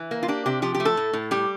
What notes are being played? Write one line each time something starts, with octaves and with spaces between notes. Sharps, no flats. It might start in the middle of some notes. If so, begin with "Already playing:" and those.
Already playing: E3
A#3
F4
D4 G4
C3 G4
F3 G4
G4
A3
A4
A2
A2
G3 G4